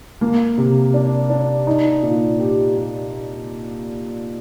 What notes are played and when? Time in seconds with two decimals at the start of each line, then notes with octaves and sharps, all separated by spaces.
0.21 A#3
0.58 C3
0.94 D4
1.30 D4
1.67 D#4
2.03 A#2
2.39 G4
2.75 G4